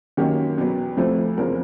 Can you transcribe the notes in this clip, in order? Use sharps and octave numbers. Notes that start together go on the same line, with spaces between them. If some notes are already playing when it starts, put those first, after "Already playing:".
F#2 D#3 F#3 A#3 C#4 G4
E2 B2 F#3 B3
D2 C3 F3 A3 C4
F1 E2 C#3 F3 A#4